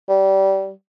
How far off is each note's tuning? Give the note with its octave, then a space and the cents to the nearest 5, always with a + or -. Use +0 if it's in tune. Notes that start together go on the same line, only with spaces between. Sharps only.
G3 -25